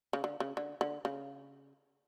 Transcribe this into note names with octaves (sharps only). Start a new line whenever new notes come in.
C#3
D3
C#3
D3
D3
C#3